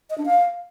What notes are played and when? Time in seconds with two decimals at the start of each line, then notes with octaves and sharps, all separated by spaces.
0.10 D#5
0.18 D4
0.26 F5